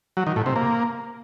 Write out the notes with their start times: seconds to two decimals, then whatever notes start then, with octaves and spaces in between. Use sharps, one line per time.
0.17 F#3
0.27 D#3
0.36 A2
0.46 C3
0.56 A#3